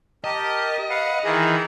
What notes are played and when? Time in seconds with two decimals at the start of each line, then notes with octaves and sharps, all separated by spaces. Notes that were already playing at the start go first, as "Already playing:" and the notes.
0.24 G4 A#4 D#5 A5
0.90 B4 F5 F#5
1.24 D#3 E3 G#4 A#5